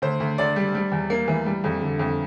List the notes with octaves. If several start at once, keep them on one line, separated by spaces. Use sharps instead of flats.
D2 C5
D2
D2 D5
G3
G3
E2
A#3
E3
G3
F2
D3
F2